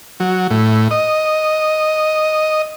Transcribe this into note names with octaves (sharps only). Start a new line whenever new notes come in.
F#3
A2
D#5